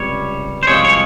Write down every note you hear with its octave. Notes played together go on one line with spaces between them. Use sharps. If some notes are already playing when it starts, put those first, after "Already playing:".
Already playing: C#2 C3 G3 C#5
C5
C2 C3 F3 G#3 C#5
C#5